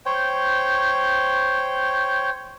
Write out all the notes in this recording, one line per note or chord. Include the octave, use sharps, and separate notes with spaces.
C5 C#5 G5